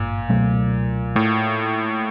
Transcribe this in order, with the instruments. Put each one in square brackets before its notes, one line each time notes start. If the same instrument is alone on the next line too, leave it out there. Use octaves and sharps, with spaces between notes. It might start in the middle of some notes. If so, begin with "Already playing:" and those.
Already playing: [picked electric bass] G#1 G2 [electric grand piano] A#2
[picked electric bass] C#2 B2 F#3 A3
[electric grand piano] A2 [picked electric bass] A3